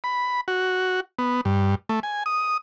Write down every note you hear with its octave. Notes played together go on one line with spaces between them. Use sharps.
B5
F#4
B3
G2
A3
G#5
D#6